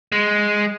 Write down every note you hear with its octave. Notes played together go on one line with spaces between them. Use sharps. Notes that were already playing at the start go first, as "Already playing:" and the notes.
G#3